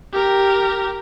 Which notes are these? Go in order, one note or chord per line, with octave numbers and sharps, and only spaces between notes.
G4 A#4